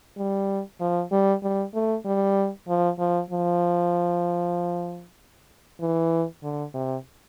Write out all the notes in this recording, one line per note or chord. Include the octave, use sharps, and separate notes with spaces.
G3
F3
G3
G3
A3
G3
F3
F3
F3
E3
D3
C3